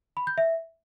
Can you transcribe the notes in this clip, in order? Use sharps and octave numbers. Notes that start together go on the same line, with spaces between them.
B5
G6
E5